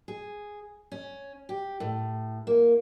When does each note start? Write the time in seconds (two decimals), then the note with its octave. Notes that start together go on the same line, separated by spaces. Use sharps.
0.08 G#4
0.92 C#4
1.49 G4
1.80 A2
2.47 A#3